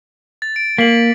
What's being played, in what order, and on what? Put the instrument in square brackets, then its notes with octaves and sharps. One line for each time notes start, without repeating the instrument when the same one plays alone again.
[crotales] A6
D7
[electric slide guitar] A#3 [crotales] B6 F#7